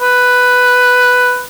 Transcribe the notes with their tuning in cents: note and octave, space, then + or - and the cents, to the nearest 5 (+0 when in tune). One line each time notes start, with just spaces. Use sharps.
B4 +5